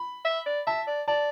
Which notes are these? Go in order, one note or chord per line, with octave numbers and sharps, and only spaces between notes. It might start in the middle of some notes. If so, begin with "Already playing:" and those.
Already playing: B5
E5
D5
E5 A5
D5
D5 A5